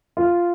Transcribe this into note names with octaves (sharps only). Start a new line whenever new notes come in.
F4